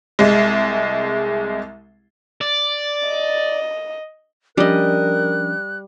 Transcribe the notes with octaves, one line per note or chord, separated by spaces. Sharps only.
C2 G#3
D5
D#5
F3 G3 C#4 D4 A#4 D#5 F#6